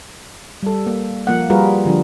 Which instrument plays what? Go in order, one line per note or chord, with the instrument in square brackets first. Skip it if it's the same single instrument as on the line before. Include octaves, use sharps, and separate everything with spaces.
[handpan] G3 A4
A#3
F3 A#3 F#5
G3 F4 F#4 G#4 A#4 B4
D3 F3 D4